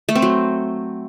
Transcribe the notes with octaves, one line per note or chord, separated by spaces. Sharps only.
A3
C4
F#3